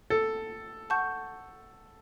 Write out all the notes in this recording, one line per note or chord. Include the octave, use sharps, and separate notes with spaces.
A4
F#5 A5 C#6 G6